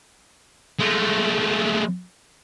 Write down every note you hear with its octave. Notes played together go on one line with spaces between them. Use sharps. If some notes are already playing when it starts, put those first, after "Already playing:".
G#3 A3